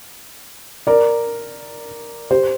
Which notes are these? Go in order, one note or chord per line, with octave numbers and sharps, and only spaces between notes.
A#4 D5
G4 C5